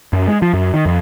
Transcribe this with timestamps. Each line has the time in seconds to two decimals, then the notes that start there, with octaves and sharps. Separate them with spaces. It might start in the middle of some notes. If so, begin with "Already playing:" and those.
0.13 F#2
0.28 G#3
0.42 F3
0.53 F#2
0.74 D#3
0.86 F2